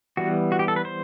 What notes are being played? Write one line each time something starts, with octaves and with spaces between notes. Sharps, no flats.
E3 G3 B3 F#4
F#4
G4
A4
B4
C5